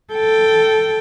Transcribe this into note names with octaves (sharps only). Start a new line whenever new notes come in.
A4 G5